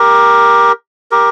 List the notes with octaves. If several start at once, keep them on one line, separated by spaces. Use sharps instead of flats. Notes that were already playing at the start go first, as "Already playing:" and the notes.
Already playing: G4 A#4
G4 A#4